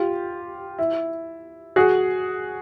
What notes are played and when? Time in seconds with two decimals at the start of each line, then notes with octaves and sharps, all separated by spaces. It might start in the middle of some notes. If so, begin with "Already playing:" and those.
Already playing: F4 G4
0.78 E4
1.76 F#4 G#4